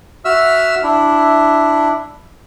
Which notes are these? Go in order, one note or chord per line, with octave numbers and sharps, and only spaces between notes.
F#4 E5 E6 F6
D4 E4